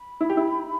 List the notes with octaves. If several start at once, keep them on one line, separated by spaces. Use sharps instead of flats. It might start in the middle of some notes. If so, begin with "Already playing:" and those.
Already playing: B5
E4
G4
E4